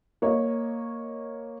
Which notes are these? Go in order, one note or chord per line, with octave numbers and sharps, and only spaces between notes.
A#3 C#5 D#5